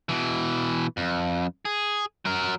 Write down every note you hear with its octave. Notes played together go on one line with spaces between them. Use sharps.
B2 E3
F2
G#4
F#3 A#4